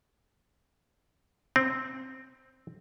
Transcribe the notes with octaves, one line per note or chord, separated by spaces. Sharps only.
C4